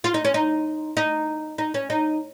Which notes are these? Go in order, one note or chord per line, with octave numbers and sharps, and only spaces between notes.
F4
D#4
C#4
D#4
D#4
D#4
C#4
D#4